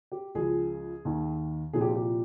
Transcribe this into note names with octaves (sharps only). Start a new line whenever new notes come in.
G4
C#2 C#3 F3 G#4
D#2 D#3
C2 A#2 F3 G#4
G4
F4
G4